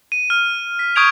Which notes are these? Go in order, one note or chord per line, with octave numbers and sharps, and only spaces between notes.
D#7
F6
B6
C#6 D#6 G6 G#6 D7 F7